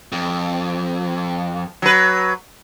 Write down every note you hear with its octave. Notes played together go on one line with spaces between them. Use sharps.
F2
F#3 B4